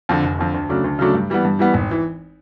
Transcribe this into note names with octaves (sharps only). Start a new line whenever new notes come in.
F2 D3
F1
F2 D3
D2
C#3 F#3 A3 D4
D2
C#3 F#3 A3 D4
G2
E3 G3 B3
G2
E3 G3 B3
G#1
E3